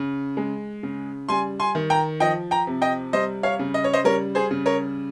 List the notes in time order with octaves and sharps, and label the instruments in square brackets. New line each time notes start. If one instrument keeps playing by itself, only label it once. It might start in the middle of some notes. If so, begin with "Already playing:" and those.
Already playing: [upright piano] C#3
G#3
C#3
G3 G#5 C6
G#5 C6
D#3
G5 A#5
F3 D#5 G5
G5 A#5
C3
D#5 G5
G3 C5 D#5
C#5 F5
C#3
D#5
C#5
C5 D#5
G3 A#4 C#5
G#4 C5
C#3
A#4 C#5